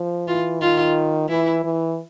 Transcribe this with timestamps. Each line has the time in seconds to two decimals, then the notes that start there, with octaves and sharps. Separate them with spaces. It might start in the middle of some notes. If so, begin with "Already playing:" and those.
Already playing: F3
0.28 E3 F4
0.61 D#3 F4
1.29 E3 E4
1.64 E3